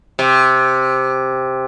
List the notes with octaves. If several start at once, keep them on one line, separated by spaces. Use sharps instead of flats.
C3